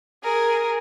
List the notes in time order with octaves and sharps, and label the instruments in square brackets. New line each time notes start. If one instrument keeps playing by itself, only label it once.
[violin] G#4 A#4